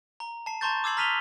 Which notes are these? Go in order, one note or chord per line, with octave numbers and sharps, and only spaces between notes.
A#5
A5 C7
A5 A#5 C6 C#6 G6 A6
D6 E6 G#6 C7 F#7
A#5 F6 B6 D#7 F7 G7